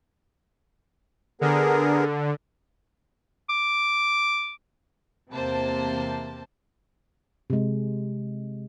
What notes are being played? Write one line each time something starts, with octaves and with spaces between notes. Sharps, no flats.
D3 B3 G#4 A#4
D6
E2 C3 A#3 C5 A5
C3 G#3